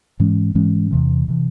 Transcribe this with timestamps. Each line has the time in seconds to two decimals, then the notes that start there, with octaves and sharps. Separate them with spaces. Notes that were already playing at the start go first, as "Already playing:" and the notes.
0.20 G#2 E3 G#3 C#4
0.55 G#2 E3 G#3 C#4
0.91 E2 C3 E3
1.28 C3 E3